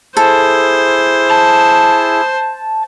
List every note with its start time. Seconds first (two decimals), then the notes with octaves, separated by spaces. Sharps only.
0.17 E4 G#4 A4 C5
1.30 A5